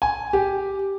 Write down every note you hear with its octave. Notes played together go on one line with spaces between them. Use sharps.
G#5
G4